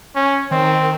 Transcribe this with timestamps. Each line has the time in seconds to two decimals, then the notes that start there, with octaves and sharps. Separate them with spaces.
0.16 C#4
0.51 D#3 C4